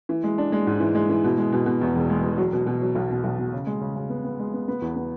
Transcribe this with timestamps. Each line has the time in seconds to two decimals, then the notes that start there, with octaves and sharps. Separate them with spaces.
0.09 E3
0.24 G#3
0.38 D4
0.52 G#3
0.67 G#2
0.80 E3
0.95 G#3
1.09 E3
1.24 B2
1.38 G#3
1.53 B2
1.66 B2
1.81 E2
1.95 E1
2.10 G#3
2.24 E1
2.38 F#3
2.53 B2
2.67 B2
2.82 F#3
2.95 B1
3.11 B2
3.24 B1
3.39 B2
3.53 C#3
3.67 G#3
3.81 C#3
3.96 C#3
4.10 B3
4.24 B3
4.39 G#3
4.54 B3
4.68 B3
4.82 E2
4.96 B3